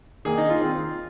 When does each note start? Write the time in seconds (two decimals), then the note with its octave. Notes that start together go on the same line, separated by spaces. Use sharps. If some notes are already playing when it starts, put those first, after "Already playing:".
0.25 D#3 A#3 G#4
0.38 D#4
0.50 F4
0.61 D#3 C4